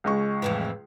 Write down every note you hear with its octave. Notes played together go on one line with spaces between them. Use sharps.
C#2 G#3 C#6
F2 A2 E3